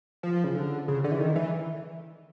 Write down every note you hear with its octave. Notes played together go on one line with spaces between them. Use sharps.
F3
C#3
D3
C#3
D3
E3
D#3
E3